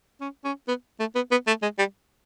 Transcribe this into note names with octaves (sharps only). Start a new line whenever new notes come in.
C#4
C#4
B3
A3
B3
B3
A3
G#3
G3